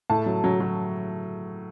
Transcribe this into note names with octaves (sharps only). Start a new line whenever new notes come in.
A2 A5
F#3
F#3
F#3